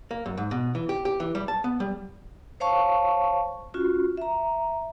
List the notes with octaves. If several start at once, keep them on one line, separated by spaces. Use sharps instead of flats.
A#3
F#2
G#2
B2
E3
G4
G4
E3
G3
A5
B3
G3
C5 C#5 F5 A5 C#6
C#4 F4 F#4
E5 A#5